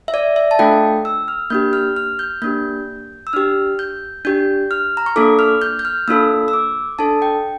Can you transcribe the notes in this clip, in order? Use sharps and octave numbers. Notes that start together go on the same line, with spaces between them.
E5
D5
E5
A5
A3 D4 F4 A4 G5
E6
F6
A#3 D4 G4 G6
F6
F6
G6
A#3 D4 G4 G6
E6
D4 G4 F6
G6
D4 G4 G6
F6
A#5
C#6
A#3 D4 F4 A4 D6
F6
G6
G6
F6
A#3 D4 F4 A4 E6
E6
D6
D4 A4 A5
G5